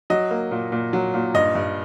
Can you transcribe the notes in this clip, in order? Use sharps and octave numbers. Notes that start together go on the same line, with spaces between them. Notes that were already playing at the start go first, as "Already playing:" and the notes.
F#3 D#5
A#3
A#2
A#2
F#3
A#2
G2 D#5
G2